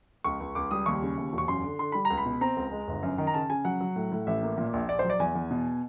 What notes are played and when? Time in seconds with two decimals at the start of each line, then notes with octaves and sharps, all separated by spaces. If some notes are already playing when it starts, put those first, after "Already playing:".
0.24 C#2 C#6
0.40 C#2
0.55 C#2 D6
0.71 G3 D#6
0.86 D#2 C#6
1.02 C#3
1.18 D#2
1.33 E1
1.38 C#6
1.48 F#2 C6
1.63 D3
1.79 D3 C6
1.92 G3 B5
2.05 A#5
2.10 C#2
2.18 B5
2.26 B2
2.41 C4 A#5
2.57 C#2
2.71 G#3
2.87 G1
3.03 F#2
3.18 D#3
3.27 A#5
3.34 C#3 A5
3.50 C#3 G#5
3.65 F#3 F#5
3.80 F#3
3.96 A2
4.12 A2
4.27 A1 E5
4.43 A#3
4.58 A#2
4.73 A#1
4.89 A#1 D5
4.99 C5
5.04 F#3
5.10 D5
5.19 E2 G#5
5.35 E2
5.51 B2